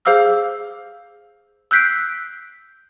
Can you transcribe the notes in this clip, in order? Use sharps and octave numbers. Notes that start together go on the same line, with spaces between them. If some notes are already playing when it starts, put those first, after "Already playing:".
G#4 C5 F5 D6 E6 F6
E6 F#6 G6 B6 C7 D7